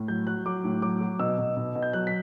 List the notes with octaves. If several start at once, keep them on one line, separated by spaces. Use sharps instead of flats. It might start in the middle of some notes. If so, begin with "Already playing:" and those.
Already playing: A2
F#3 G6
F#3 F#6
F#3 D6
A2
F#3 D6
F#3
B2 E6
B2
B2
B2
G6
F#3 F#6
B6